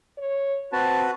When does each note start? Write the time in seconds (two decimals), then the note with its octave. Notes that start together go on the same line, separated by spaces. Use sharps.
0.18 C#5
0.73 C4 F#4 B4 A5